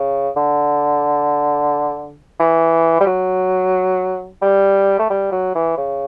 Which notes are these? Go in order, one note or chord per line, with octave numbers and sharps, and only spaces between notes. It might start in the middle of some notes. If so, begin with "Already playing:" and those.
Already playing: C#3
D3
E3
G3
F#3
G3
A3
G3
F#3
E3
C#3